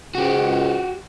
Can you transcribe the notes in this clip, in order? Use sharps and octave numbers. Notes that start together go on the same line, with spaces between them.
C#2 G#2 F#4 G4